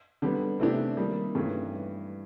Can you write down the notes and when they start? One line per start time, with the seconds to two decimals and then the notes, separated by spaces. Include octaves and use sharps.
0.22 D3 G3 B3
0.60 C3 E3 A3 D4 G4
0.97 D#3 G3 A#3 D#4
1.35 G2 E3 A3 C#4